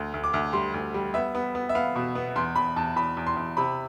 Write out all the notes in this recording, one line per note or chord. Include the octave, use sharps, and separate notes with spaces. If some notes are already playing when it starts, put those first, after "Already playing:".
Already playing: D2
D2
D6
D2
G3 C6
D2
G3
B3 E5
B3
B3
E5
B3 F5
B2
B3
E2 C6
E2 B5
E2 A5
E2 B5
E2
C6
E2
C3 B5